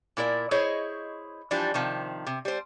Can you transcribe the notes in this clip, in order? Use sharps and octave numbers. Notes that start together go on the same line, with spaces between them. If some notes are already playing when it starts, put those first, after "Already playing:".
A#2 E4 A#4 D5
E4 G#4 C5 C#5 D#5
E3 F3 G3 D4 G4
C3 D#3 F3
C3
G3 C5